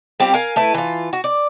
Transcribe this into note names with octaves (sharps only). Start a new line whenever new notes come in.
G3 C4 F4 G4
A#4 F5 G#5
A3 E4 B4
E3 F4
F#4
D5